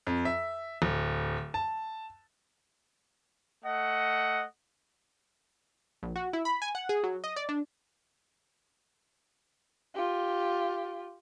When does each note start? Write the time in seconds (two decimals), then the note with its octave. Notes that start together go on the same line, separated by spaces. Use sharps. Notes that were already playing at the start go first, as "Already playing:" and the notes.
0.07 F2
0.25 E5
0.82 D1
1.54 A5
3.64 A3 D#5 F#5
6.03 A#1
6.16 F#4
6.33 E4
6.45 B5
6.62 G#5
6.75 F#5
6.89 G#4
7.03 F#3
7.24 D#5
7.36 D5
7.49 D4
9.95 F4 G4